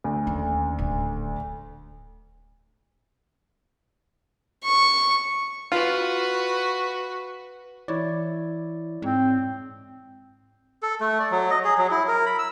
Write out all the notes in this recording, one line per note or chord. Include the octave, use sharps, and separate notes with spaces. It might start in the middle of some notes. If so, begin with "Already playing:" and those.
D2
D#2 C#4
D1
C#6
F4 F#4 B4
E3 E4 C#5 D5
G#2 C4
A4
A3
D5
F#3
D#5
G#4
F#3
E4
A#4
B5
E6